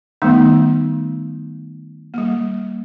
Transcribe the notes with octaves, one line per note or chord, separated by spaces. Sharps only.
D#3 G3 A3 B3 D#4
G3 A#3